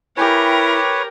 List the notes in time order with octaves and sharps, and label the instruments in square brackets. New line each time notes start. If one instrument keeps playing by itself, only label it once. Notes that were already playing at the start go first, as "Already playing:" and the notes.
[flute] E4 [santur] G4 G5 G#5 [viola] A#4 [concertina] B4 C#5